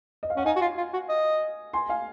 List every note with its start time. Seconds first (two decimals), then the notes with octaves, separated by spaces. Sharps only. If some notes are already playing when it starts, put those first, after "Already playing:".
0.23 D#5
0.30 F5
0.36 C#4 F#5
0.45 D#4 F5 G#5
0.56 F#4
0.61 F4
0.77 F4
0.93 F#4
1.09 D#5
1.73 G#5 C6
1.89 F5 G#5